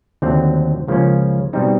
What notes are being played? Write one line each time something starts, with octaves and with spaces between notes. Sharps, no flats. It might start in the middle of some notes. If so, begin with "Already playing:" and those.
D#2 D3 F#3 A3 C4
C#2 C#3 F3 A#3 C#4
B2 G3 C4 D#4